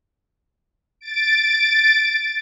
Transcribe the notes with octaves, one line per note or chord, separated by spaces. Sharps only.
A6 D7